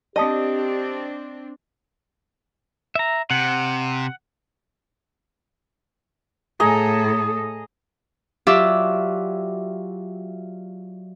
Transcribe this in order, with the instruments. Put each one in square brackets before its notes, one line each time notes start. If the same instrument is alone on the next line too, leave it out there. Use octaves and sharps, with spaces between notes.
[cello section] C4 D4 [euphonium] G4 [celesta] D5 A5 D#6 [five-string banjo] D#5
[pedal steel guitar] E5 A#5
[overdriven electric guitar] C3 [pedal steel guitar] F#5
[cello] A2 A4 [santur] G#4 D#5 A#5
[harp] F#3 F4 G4 D5 E5